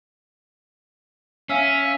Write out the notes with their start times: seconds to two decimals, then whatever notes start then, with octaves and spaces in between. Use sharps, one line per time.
1.49 C#4 E5 F5